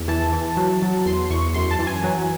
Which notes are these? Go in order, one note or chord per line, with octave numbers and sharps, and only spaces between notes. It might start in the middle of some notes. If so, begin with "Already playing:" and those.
Already playing: E2
E3 A5
E3
F#3
F#3
E2 C6
E2 C#6
F#2 C6
A5
E3
G#5
F#3